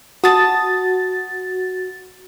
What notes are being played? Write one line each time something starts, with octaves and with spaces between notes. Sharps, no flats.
F#4 A5 D#6 A6